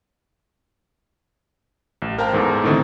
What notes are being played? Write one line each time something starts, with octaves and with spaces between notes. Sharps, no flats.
A1
A#4 C5 F5 G5 A5 A#5
E2 G#2 A4 A#4
A2 D3 D#3 C4 E4